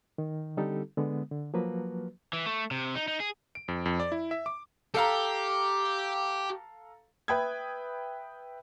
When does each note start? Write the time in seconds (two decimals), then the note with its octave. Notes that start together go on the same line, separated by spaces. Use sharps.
0.18 D#3
0.57 D3 G3 C4 D#4 G4 A4
0.98 D3 G#3 B3
1.31 D3
1.54 F3 F#3 A#3 F#4 B4
2.33 E3
2.46 A3
2.71 C3
2.95 D#4
3.08 D#4
3.20 G#4
3.55 D7
3.68 F2
3.86 F2
4.00 D5
4.12 E4
4.31 E5
4.46 D6
4.94 G4 A4 F5 A#5
7.28 B4 E5 G5 B5 D#6 G#6